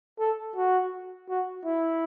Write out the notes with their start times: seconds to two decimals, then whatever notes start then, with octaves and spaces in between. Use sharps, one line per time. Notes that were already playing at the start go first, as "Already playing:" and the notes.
0.19 A4
0.56 F#4
1.29 F#4
1.65 E4